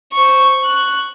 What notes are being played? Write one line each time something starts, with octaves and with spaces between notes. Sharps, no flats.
C5 C#6
C#6 F#6